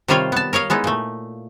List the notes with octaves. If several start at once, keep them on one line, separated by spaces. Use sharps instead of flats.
C3 D#3 G3 F4 C#5 F5
B3 A5
A#4 C#5 D#5 F5
G#3 B3 D#4 E4
A#2 A3